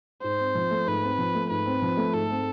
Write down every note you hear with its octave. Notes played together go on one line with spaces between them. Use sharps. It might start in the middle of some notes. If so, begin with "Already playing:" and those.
G#2 C5
C4
F3
A3
G#2 B4
C4
F3
A3
G#2 B4
C4
F3
A3
G#2 A4
C4